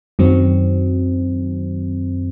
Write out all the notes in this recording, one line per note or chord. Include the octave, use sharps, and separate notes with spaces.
F#2 D#3 F#3 C4